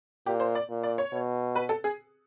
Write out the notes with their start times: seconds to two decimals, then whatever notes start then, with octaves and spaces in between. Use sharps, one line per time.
0.26 A#2 G4
0.40 C5
0.55 D5
0.69 A#2
0.83 D5
0.98 C#5
1.13 B2
1.55 B4
1.69 A4
1.84 G#4